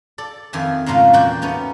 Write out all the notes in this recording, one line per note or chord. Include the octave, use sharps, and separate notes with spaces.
A4 D5
F2 D#3 F4 E5 G#5
G#2 C#3 A3 A#3 F4
E2 A#2 F#4 D5 G5
A3 B3 C#4 D#4